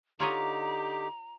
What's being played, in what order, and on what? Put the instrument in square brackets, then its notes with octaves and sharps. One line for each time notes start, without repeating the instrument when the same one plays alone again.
[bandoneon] D3 D#4 D6 [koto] F4 C#5 D#5 [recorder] G4 [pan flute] A#5